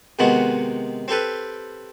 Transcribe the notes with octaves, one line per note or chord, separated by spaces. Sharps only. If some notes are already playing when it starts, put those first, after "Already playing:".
C3 D#3 G#3 B3 F#4
C4 G4 A4 B4